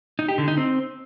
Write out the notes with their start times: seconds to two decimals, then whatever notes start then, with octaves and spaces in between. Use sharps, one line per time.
0.19 D#4
0.28 G4
0.38 D3
0.48 D#4
0.57 C4